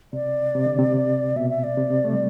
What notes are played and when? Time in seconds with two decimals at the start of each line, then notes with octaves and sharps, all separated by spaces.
0.13 C3 D5
0.55 C3
0.66 D3
0.79 C3
1.36 B2 E5
1.50 E5
1.64 D5
1.77 C3
1.90 C3
2.04 A3
2.13 G3